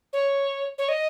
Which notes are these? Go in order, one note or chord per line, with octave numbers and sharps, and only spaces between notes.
C#5
C#5
D#5